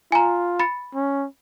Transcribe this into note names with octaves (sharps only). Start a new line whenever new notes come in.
F4 G#5 A#5
B5 A6 C#7
C#4